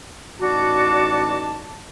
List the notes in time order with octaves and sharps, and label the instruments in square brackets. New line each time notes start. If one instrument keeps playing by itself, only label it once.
[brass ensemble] A1 D#4 A5 [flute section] F#4 D5 D6